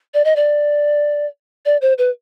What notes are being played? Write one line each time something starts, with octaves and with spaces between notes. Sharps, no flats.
D5
D#5
D5
D5
C5
B4